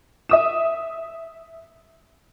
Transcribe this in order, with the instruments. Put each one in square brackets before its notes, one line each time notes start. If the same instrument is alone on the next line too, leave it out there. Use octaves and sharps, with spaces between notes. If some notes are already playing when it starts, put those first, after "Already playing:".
[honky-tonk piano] E5 D#6 E7